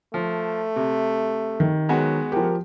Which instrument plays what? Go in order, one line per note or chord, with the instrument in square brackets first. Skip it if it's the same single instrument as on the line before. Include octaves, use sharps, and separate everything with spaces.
[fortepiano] F3 [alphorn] A3
[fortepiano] C3
[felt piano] D#3
[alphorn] F#3 [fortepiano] G#3 B3 F#4
[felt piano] F3 G4 [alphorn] A#4